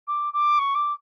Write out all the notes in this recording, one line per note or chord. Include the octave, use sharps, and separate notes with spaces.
D6
D6
C#6
D6